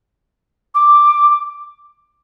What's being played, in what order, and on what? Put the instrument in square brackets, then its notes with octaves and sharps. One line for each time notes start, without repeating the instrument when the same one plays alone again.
[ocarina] D6